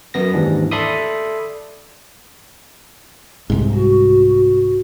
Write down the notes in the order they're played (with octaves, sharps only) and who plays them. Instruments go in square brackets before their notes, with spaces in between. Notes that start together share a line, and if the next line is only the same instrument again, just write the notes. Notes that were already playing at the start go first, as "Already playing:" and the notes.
[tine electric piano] F#2 B3 A#6
D#2 G#2 E3 D4
A4 D5 E5 B5 C6 D#6
[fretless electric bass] C2 G#2
[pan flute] F#4